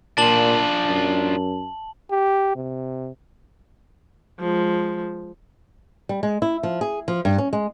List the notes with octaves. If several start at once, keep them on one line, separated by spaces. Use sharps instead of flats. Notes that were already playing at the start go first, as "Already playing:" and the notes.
A#2 D4 F4 A5 F#7
F#2
G4
C3
F3 G#3
G3
G#3
E4
F3
G#4
F3
G2
C#4
G#3